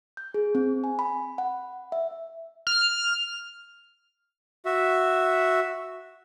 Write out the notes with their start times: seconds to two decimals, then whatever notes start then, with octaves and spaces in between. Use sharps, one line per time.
0.17 G6
0.34 G#4
0.55 C4
0.84 G#5
0.99 B5
1.38 F#5
1.92 E5
2.67 F6
4.65 F#4 E5